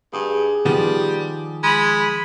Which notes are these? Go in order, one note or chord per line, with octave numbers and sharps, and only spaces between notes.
G2 G#4
D#3 F3 G3 B3
G#3 B5